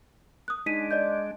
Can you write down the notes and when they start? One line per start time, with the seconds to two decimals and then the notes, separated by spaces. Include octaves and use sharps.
0.48 D#6 F#6
0.66 G#3 D4 D#4 B6 D#7
0.91 D5 D#5 G6